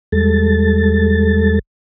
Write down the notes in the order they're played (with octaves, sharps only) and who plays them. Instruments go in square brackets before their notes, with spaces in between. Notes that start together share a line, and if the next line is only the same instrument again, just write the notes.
[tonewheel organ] E2 G3 G#3 A4 A6